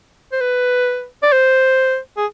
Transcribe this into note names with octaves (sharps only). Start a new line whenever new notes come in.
C5
B4
D5
C5
G#4